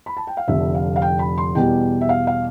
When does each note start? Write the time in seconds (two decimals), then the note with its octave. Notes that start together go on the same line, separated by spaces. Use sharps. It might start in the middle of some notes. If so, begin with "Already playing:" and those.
0.06 B5
0.17 A5
0.27 G5
0.37 F5
0.48 F1 F2 D3 E5
0.75 F5
0.96 F5
1.02 G5
1.19 B5
1.38 C6
1.55 E2 B2 G3 G5
2.01 E5
2.09 F5
2.27 F5